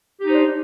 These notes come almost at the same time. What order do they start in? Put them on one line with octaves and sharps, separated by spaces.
G4 D#4 C5 D4